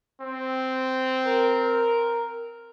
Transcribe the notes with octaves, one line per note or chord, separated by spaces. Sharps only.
C4
A#4